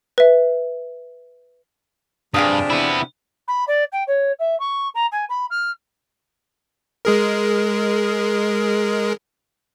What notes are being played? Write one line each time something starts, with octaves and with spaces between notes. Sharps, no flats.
B4 E5
G2 C3 F3 D4 G#4 F5 D#6
B3 E4
B5
D5
G5
C#5
E5
C#6
A#5
G#5
B5
F6
G#3 G#4 A#4